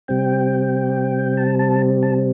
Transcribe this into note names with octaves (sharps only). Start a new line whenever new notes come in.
C3 G3 C4 G5
A5
A5
A5